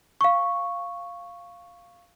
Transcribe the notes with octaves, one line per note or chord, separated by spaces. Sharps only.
F5 C#6